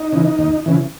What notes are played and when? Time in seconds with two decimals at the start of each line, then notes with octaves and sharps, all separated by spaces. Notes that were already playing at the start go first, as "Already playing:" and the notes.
Already playing: D#4
0.12 C#3 E3
0.39 D#2
0.66 C#3 E3